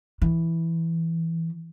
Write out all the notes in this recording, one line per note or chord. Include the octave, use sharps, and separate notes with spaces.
E3